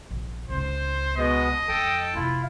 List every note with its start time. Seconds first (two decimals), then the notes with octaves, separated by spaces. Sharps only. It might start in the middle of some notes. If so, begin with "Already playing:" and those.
0.11 A#1
0.50 C#2 D#4 C5
1.17 B2 G#3 B3 D#5
1.69 F2 A4 G5 A5
2.15 F1 A#1 E4 F4